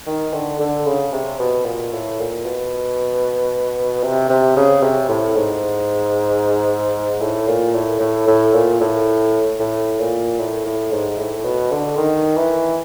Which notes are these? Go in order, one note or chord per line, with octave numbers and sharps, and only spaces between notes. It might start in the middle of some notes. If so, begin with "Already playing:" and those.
D#3
D3
D3
C#3
C3
B2
A#2
A2
A#2
B2
C3
C3
C#3
C3
A2
G#2
A2
A#2
A2
A2
A2
A#2
A2
A2
A#2
A2
A2
G#2
A2
B2
D3
D#3
E3